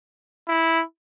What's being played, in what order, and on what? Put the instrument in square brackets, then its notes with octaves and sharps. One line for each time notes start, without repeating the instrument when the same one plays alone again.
[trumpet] E4